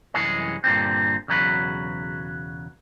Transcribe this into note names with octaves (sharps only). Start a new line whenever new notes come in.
C2 F#2 E3 G#3 G#4 C#5
G2 A#2 D3 C4
B1 E2 C#3 F#3 B4